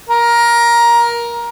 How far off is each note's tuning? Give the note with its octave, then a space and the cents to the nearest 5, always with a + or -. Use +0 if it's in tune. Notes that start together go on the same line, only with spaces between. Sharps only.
A#4 +15